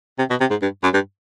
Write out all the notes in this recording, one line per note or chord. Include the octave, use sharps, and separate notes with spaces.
C3
B2
C3
G#2
G2
F#2
G2